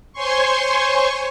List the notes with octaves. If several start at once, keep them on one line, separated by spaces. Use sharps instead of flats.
C5 C#5 G#5 C6 C#6